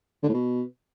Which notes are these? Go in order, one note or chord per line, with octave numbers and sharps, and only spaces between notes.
D3
A2
B2